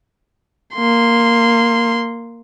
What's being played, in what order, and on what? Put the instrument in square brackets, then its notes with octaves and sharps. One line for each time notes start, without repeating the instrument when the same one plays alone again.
[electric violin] A#3 C6